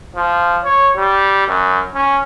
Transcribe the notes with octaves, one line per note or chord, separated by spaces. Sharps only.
F3
C#5
G3
F#2
C#4